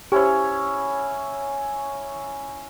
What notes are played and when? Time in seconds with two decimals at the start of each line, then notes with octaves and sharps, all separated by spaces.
0.12 C#4 E4 G4 C5 C#5